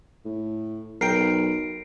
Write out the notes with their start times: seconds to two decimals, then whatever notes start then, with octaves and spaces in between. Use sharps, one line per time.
0.25 A2
1.01 B1 A#4 G5 C7 D7